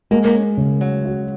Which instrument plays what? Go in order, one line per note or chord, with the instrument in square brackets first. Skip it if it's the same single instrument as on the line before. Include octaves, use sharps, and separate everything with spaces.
[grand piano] G#3 [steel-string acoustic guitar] A#3
[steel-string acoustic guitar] A#3
C#4
[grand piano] C#3
[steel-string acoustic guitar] F#3
[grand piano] F#4